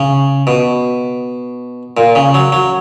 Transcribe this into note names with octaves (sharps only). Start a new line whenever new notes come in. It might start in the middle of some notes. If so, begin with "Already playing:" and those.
Already playing: C#3
B2
A#2
C#3
F#3
F#3